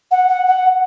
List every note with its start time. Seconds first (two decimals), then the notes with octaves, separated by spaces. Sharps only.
0.11 F#5
0.28 F#5
0.47 F#5